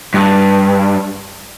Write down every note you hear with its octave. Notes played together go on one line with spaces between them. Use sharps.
G2